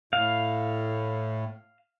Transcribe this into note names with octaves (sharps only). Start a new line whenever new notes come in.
A2 F5